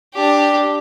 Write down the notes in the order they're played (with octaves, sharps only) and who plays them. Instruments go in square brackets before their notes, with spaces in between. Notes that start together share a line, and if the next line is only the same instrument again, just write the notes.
[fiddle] D4 G4